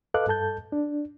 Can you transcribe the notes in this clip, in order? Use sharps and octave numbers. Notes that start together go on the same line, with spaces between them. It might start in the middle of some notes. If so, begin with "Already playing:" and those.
A4 B4 D#5 F5 D6 F#6
G2 A4 A5 G6
D4